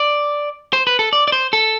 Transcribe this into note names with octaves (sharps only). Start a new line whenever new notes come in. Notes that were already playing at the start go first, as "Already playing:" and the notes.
Already playing: D5
C5
B4
A4
D5
D5
C5
A4